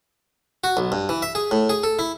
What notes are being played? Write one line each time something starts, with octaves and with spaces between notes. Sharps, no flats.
F#4
B1
G2
E3
E5
G#4
A2
G#4
A4
E4